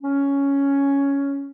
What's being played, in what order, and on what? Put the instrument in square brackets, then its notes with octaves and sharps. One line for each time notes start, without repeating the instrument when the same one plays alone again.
[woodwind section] C#4